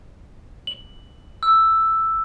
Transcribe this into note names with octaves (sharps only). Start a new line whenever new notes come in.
F#7
E6